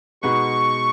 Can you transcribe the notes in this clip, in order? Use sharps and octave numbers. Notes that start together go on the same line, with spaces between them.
B2 G#3 D#4 F#4 B4 C#6